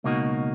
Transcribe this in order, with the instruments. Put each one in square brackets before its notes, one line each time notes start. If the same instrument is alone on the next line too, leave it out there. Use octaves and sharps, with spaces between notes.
[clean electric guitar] C#2 B2 A#3 D#4 F#4